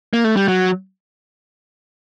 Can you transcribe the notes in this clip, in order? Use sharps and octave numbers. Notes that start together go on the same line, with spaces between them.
A#3
A3
G3
F#3